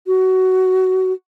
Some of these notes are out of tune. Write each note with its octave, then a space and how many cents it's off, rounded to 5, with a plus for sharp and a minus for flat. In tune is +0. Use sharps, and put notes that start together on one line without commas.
F#4 +15